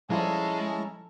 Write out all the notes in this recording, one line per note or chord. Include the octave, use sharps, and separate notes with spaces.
F3 G3 G#3 C#4 E4 F4 A4 A#5